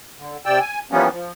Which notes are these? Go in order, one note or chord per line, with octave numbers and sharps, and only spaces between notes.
D3
C3 D5 G5 E6
G#5
E3 F3 G3 A#3 B3 C#4
F3